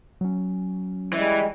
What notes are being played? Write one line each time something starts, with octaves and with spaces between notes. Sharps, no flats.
F#3 C#4
E3 G3 G#3